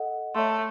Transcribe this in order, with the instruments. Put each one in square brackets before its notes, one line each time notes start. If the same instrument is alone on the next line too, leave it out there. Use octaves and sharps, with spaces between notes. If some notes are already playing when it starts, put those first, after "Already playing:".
Already playing: [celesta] A4 D#5 F#5
[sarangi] A3 [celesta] C#5 E5 C6